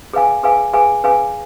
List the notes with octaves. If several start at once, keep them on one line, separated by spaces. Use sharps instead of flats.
G#4 B4 F5 G#5
G#4 B4 F5 G#5
G#4 B4 F5 G#5
G#4 B4 F5 G#5